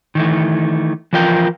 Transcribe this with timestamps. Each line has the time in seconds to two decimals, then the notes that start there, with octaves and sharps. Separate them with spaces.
0.15 D#3 E3 A3
1.13 E3 F3 F4 A#4 G5